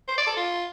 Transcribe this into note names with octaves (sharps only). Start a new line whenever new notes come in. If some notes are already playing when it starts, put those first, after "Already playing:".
C5
D5
A4
F4